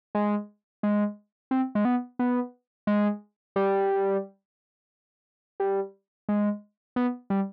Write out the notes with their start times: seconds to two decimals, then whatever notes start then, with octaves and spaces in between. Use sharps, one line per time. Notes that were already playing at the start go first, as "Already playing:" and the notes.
0.15 G#3
0.83 G#3
1.51 C4
1.75 G#3
1.85 B3
2.19 B3
2.87 G#3
3.56 G3
5.60 G3
6.29 G#3
6.96 B3
7.30 G3